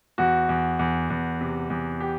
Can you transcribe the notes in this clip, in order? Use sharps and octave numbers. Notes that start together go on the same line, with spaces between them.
E2 F#4
E2
E2
E2
C3
E2
G4